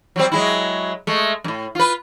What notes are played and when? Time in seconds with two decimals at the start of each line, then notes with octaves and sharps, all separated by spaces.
0.16 F#3 G3 C4
0.32 F#3 G#3 E4
1.07 G#3 A3
1.44 F#2 A2
1.75 F4 B4